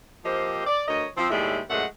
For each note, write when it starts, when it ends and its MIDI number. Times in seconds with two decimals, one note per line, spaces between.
0.25 0.66 53
0.25 0.66 58
0.25 0.66 60
0.25 0.66 67
0.25 0.66 72
0.25 0.66 75
0.67 0.82 74
0.88 1.06 38
0.88 1.06 70
0.88 1.06 73
0.88 1.06 75
1.17 1.30 53
1.17 1.30 60
1.31 1.61 39
1.31 1.61 45
1.31 1.61 55
1.31 1.61 56
1.31 1.61 74
1.31 1.61 76
1.69 1.85 42
1.69 1.85 46
1.69 1.85 56
1.69 1.85 57
1.69 1.85 78